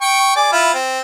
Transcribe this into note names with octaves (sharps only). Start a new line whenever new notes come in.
G5 C#6
G#4 D5
E4 F4
C4